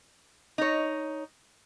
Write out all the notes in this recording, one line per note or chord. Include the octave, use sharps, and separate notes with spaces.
D#4 C#5